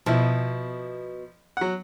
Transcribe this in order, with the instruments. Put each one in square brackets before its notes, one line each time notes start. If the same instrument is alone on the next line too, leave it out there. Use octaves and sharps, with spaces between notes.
[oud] B2 [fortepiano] F3 E4
[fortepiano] F#3 F#5